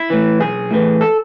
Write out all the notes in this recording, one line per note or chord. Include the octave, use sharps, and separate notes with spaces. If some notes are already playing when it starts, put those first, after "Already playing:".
Already playing: E4
A2 E3
B1 G#4
A2 E3
A4